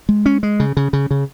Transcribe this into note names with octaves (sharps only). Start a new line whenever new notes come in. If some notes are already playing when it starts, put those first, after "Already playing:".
G#3
C#4
G#3
C#3
C#3
C#3
C#3